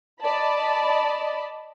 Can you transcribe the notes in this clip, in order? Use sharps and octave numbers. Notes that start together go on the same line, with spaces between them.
D5 D#5 A5 B5